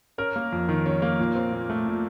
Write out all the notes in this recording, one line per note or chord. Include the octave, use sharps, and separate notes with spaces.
C#4 A#4
A#3
F2
D#3
C#4
A#3
A#2
C4
A#2
A3
A#2